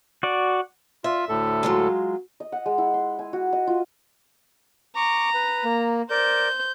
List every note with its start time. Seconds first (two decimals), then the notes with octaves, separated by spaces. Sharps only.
0.23 F#4 D5
1.04 F4 E5
1.29 D2 A2 A4
1.63 F#3 G#3 F4
2.40 D#5
2.52 F#5
2.66 G#3
2.78 E4
2.94 C6
3.19 G#5
3.33 F#4
3.53 D#5
3.67 F4
4.96 A#5 C#6 D6
5.34 B4
5.64 A#3
6.10 A#4 C5 D5 G6